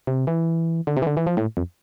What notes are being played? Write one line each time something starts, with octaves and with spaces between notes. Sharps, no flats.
C3
E3
D3
C3
E3
D3
E3
F3
A2
F2